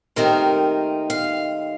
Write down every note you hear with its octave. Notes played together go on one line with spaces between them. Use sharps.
D#2 D#3 A3 C4 D#4 A#4
F5